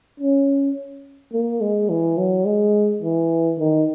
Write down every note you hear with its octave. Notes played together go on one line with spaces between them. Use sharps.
C#4
A#3
G#3
E3
F#3
G#3
E3
D#3